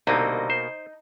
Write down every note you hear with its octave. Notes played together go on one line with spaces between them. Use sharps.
C2 B2 D3 A#3 C4 D#4
C5